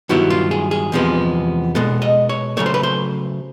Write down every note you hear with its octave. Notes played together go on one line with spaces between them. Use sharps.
G2 D#3 F#3 B3 E4 F#4
F4
G#4
G#4
E2 C3 F3 G#3 B3
B2 G#3 B3 A4
D#5
C#5
C#3 F#3 A3 C#5
C5
B4
C5